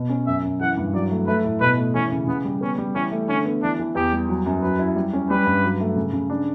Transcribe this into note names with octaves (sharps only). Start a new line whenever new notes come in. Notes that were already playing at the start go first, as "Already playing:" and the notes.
Already playing: B2
C#4
F#2 E5
F#2
E3 F#5
G2
F#3 D5
A3
A3 B4
A2
B2 B4
A3
E3 C#4
C#3
C#3 B3
G3
B3 C#4
G3
E3 C#4
A3
D3 C#4
B3
E3 D4
E3
E2 G4
G3
F#3
F#2
F#3 B4
E4
G3
C#4
G3 B4
G2
F#3
A3
C#3
C#3
D4